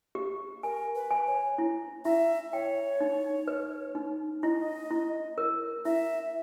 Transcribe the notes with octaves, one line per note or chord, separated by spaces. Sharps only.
G4
A#4 G#5
B4
G#5
C#5
E4
E4 E5
C#5 G5
D#4
B4
D#4
E4 D#5
E4
A#4
E4 E5